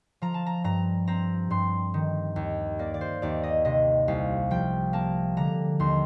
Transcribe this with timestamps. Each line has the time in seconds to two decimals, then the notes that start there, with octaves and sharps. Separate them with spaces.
0.22 F3 A#5
0.34 A5
0.46 A#5
0.64 G2 A#5
1.07 C4 A#5
1.50 G2 C6
1.94 D#3
2.36 D#2
2.79 A#3 D5
2.94 D5
3.01 C5
3.22 D#2 D5
3.43 D#5
3.65 C3 D#5
4.08 C2 F5
4.51 F3 G5
4.93 A#3 A5
5.37 D3 A#5
5.80 D#2 C6